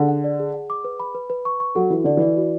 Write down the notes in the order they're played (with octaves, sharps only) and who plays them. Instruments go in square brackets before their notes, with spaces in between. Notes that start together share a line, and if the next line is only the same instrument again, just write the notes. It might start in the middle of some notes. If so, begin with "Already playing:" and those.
Already playing: [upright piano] D3 [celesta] G#4
[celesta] F#5
D5
G#4
F#5
D6
B4
B5
B4
B4
C#6
C#6
[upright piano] F#3 [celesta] A4
[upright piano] E3 [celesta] F#4
[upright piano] D3 [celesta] D5
[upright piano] E3 [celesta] D5
[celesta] F#4